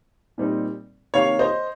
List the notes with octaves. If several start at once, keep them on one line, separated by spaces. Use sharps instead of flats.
A#2 G3 C4 D#4
C3 D#3 A#3 C#5 F5
C5 D#5